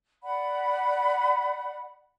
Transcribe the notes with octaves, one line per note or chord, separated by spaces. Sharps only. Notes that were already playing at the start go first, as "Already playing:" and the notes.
D5 F#5 B5